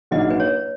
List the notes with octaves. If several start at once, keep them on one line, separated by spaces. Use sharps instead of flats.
A#1 G#2 F#3 A#3 E4 D#5
B4
C#5